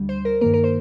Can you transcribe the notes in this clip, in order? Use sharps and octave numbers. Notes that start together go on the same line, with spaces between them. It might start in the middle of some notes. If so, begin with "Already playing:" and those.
Already playing: D2 D3 G3
C5
A#4
G2 D#3 A#3 A#4
A#4
C5